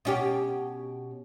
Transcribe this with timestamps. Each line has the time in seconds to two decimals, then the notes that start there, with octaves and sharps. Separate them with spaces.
0.05 B2 C#4 G4